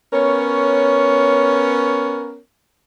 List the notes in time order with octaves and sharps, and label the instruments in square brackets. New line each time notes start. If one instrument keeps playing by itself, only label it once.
[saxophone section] B3 C#4 A#4 C#5